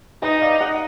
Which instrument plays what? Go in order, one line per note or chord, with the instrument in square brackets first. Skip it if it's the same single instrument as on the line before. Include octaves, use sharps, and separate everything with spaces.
[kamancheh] D#4 [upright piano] B4 D#5
[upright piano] D5 F5
D#5 F#5